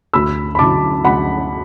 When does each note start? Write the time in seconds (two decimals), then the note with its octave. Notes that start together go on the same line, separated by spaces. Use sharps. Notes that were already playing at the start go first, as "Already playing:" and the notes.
0.13 D2 B5 E6
0.55 B5
0.59 D3 F#3 A5 D6
1.05 D2 F#5 B5